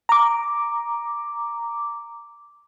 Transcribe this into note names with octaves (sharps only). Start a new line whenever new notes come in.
A#5 D6